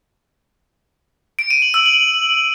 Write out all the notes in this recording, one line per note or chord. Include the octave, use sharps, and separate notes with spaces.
D7
D#7
F#7
E6
F#7